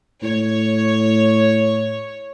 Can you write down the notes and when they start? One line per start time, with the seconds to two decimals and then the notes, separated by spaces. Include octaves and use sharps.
0.23 A2 C#5